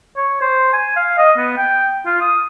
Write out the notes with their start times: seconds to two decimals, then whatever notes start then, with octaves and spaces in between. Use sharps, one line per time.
0.17 C#5
0.41 C5
0.73 G#5
0.96 F5
1.18 D#5
1.38 B3
1.57 G5
2.06 F4
2.21 D#6